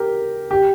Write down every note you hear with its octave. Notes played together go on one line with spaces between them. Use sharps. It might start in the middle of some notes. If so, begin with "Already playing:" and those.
Already playing: G4 A#4
G4